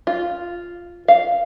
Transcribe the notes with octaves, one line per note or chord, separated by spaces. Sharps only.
F4
F5